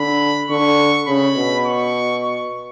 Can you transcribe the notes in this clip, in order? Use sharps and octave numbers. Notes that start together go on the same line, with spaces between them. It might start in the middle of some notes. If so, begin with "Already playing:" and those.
Already playing: D3 B5
D3 C#6
C#3 B5
B2
C#6
C#6